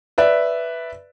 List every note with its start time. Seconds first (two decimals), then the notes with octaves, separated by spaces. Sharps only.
0.18 B4 D5 E5